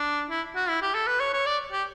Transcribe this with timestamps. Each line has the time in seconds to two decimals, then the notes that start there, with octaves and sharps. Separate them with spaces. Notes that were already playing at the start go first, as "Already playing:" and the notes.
Already playing: D4
0.30 E4
0.56 F#4
0.69 E4
0.82 G4
0.95 A4
1.07 B4
1.20 C#5
1.33 C#5
1.46 D5
1.72 G4